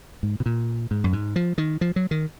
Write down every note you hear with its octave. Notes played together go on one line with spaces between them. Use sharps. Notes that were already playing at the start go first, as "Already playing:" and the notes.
G#2
B2
A#2
G#2
F#2
G#2
F3
D#3
F3
F#3
D#3